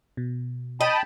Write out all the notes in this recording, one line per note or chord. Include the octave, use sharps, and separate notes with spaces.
B2
D#5 G5 A5 B5